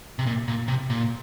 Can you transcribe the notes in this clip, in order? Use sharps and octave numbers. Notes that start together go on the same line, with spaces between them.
C3
A#2
A#2
C3
A#2